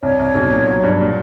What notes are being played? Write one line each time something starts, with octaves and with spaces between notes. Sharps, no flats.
C2 C#5
C2
B1
A#2
F#3
G2
A#2